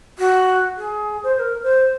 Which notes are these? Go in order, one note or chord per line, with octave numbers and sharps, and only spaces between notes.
F#4
G#4
C5
C5
A#4
C5